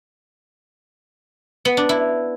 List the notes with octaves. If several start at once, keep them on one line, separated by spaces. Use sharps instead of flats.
B3
D4
E4